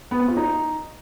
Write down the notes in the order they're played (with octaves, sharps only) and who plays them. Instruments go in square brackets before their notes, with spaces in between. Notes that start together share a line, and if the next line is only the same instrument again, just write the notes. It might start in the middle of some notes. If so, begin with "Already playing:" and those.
[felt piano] B3
C4
F4
D#4